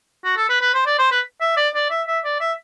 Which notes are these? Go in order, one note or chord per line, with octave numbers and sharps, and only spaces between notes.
F#4
A4
B4
B4
C5
D5
C5
B4
E5
D5
D5
E5
E5
D5
E5